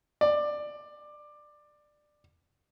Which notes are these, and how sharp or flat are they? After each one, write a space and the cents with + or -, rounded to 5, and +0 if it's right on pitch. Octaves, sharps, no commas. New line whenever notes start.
D5 +15